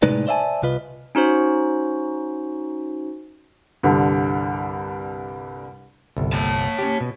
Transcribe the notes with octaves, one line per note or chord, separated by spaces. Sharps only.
A2 C3 G#3 D#4 B4 D5
C5 D5 E5 F5 G#5 A5
C2 C3 F4 B4 D#5
C#4 D#4 F#4 C5
C2 G2 D3
G1 C2
C#5 A5
C#4 G4
B2